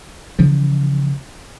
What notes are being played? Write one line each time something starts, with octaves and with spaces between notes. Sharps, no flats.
C#3 E3 F3